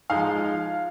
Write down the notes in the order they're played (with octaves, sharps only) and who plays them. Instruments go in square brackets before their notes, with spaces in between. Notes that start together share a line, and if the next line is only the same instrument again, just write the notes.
[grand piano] F3 G#3 D#4 F5